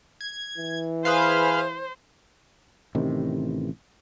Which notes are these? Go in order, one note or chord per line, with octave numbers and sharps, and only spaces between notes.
G#6
E3
G#4 B4 C5 F5
A1 C3 D#3